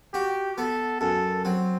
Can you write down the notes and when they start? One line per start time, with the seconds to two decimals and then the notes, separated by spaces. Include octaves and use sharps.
0.13 F#4 G4
0.58 B3 A4
1.01 F#2 A4
1.45 F#3 C4